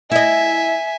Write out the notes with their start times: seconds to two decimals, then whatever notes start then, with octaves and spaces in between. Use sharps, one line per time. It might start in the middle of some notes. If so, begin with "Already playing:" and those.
0.11 E4 D#5 E5 G#5